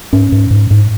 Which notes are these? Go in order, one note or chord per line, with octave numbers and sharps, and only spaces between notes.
G#2 C#4
G#2
G#2
G#2